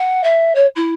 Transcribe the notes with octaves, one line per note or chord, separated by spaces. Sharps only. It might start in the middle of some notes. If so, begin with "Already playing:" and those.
Already playing: F#5
E5
C#5
E4